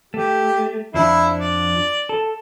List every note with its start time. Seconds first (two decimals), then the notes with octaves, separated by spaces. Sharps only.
0.14 A3 G4
0.94 F2 F3 D4 E4
1.40 D5
2.09 A4